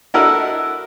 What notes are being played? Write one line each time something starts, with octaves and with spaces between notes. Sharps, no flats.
D4 E4 F#4 A4 A#4 D#5